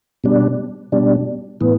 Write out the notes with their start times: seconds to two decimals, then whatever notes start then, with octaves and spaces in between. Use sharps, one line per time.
0.24 B2 G3 D4
0.92 B2 G3 D4
1.61 A2 E3 B3